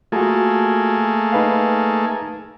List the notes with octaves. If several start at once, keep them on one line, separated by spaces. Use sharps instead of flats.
A3 A#3 F4 F#4 G#4
D#4 B4 F5